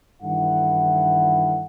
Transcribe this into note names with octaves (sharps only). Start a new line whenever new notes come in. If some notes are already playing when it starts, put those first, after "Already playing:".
G2 D#3 E3 E4 A4 F#5